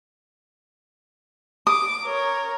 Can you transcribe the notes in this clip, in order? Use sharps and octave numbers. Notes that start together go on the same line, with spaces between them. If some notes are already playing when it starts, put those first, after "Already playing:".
D6 D#6
A#4 C#5